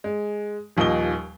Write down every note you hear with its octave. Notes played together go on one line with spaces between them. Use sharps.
G#3
D#1 D#2 F3 D#5 G7